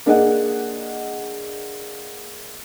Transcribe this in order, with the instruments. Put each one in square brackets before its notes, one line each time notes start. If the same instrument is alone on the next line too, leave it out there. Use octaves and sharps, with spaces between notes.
[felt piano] A#3 D4 G#4 D#5 F#5